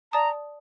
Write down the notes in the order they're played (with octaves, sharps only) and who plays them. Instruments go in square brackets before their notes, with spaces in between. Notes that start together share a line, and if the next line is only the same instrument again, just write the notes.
[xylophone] D5 A5 D#6 [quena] A#5